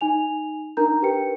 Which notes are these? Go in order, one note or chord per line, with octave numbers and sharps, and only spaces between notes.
D#4 G#5 F7
D4 D#4 A#4 A#5 G6
G4 A#4 B4 G5 C#7